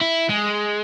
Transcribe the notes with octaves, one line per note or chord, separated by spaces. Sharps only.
E4
G#3